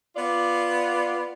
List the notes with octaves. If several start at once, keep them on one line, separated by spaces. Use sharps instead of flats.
B3 F4 D5